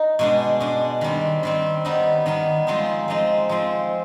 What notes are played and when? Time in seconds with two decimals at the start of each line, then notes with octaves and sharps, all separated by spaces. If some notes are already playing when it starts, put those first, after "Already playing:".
Already playing: D#4
0.19 B2 G#3 D4
0.60 B2 G#3 D4
1.01 D#3 G3 C4
1.43 D#3 G3 C4
1.85 D#3 G3 B3 D#4
2.26 D#3 G3 B3 D#4
2.67 F3 G#3 C4 D#4
3.08 F3 G#3 C4 D#4
3.49 F3 G#3 C4